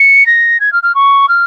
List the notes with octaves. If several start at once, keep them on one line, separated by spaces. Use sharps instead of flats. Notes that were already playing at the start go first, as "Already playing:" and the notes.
Already playing: C#7
A#6
G#6
F6
F6
C#6
F6